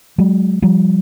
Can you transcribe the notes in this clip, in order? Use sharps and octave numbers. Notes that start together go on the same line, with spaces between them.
F#3 G#3
F3 G3